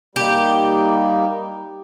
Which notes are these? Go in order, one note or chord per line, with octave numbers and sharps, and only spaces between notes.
G3 A#3 D#4 G4